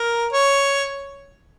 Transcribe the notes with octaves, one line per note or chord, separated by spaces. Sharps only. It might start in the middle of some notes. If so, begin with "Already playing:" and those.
Already playing: A#4
C#5